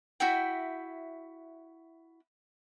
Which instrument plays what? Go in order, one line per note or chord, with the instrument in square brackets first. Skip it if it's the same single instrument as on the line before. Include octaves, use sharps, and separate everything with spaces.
[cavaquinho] E4 F#4 E5 G5